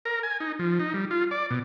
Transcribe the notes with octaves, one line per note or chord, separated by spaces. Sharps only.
A#4
G#5
D#4
F3
D#4
G3
F4
D5
B2